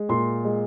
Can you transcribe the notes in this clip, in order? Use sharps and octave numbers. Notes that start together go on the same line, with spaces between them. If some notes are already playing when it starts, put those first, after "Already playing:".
Already playing: G#3
A#2 C6
G#3